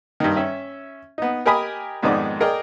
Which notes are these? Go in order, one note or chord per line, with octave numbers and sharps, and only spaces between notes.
G2 D#3
C#4 E5
B3 D#4
G4 A#4 D#5 G#5 B5 D#6
F2 G#2 D#3 B3 D#4 D5
G#4 A#4 D5 D#5 G5